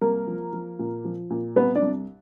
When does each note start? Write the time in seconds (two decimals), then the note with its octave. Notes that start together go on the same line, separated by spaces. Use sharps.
0.01 C2 A#3 A#4
0.27 F3
0.53 F3
0.79 A#2
1.05 F3
1.30 A#2
1.56 C2 B3 B4
1.75 D4 D5
1.82 C2